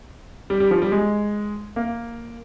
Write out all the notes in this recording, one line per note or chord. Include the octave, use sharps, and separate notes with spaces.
G3
G3
F3
G3
G#3
A#3